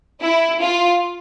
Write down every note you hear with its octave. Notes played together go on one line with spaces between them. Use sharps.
E4
F4